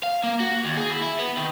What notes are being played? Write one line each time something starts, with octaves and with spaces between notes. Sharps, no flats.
F5
A#3
F#4
F#4
D#2
G#4
E4
E4
B3
D#3